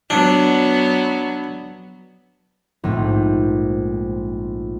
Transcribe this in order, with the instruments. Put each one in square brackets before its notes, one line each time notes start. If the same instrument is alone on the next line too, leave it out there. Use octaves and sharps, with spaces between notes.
[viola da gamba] F#3 B3 [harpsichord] D4
[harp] A#1 G#2 A3 C4